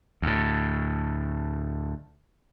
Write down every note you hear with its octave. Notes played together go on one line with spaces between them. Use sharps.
D2 A2